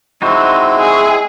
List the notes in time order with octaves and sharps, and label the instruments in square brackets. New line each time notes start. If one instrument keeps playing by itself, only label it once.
[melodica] G#3 C4 E4 [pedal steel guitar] D#4 F#4 C5 [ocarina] C#6
[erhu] G#4